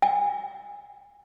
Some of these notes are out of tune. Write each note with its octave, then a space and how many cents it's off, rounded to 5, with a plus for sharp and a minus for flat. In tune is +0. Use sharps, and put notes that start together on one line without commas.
G#5 -20